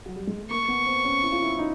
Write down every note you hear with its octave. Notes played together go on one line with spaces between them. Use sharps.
F#3
G3
G#3
A3
A#3 C#6
B3
C4
C#4
E4
F4
E4
D#4